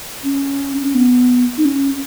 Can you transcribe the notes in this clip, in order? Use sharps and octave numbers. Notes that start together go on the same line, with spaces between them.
C#4
C#4
B3
D#4
C#4